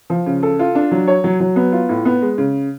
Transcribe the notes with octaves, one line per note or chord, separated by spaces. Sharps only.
F3
C#3
A4
F4
D4
F#3
C#5
F#3
F#3
B3
F4
A2
B3
G#3
C#3